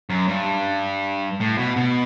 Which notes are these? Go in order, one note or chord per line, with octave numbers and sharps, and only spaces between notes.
F#2
G2
A2
B2
B2